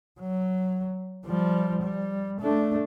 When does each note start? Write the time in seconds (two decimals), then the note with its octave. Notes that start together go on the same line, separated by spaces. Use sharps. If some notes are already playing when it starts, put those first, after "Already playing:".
0.21 F#3
1.25 F3 G3
1.82 G3
2.40 A3 D4